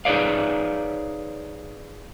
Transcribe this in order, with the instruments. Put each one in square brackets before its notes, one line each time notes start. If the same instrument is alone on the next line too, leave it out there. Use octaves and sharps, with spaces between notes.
[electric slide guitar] D#4 G#4 B4 C#5 D5 F5